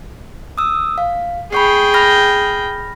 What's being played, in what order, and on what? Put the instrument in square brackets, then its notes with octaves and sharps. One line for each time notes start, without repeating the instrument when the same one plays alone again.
[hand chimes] D#6 E6
F5
[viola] G#4 G5 [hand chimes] B5 C#6 C7
[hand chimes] B5 F6 A#6